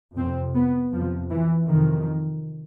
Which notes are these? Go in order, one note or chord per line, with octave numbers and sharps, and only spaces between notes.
F2 C3 C4
B3
F2 C3 F3
E3
F2 C3 D#3